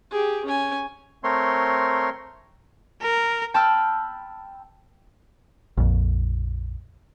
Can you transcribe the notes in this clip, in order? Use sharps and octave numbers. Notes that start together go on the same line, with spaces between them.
G4 G#4
C#4 G#5
A3 C4 A#4 C#5 C6
A#4
G5 A5 B5 E6 F6
A#1 F2